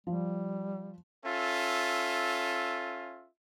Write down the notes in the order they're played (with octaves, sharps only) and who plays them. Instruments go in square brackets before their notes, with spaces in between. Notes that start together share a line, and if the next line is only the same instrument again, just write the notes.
[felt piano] F3 [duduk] G3
[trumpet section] C#4 F4 A4 E5